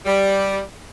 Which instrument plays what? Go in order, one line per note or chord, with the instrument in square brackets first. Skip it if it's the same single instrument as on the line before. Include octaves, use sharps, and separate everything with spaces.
[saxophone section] G3